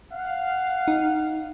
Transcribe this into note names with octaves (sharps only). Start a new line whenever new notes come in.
F5 F#5
D#4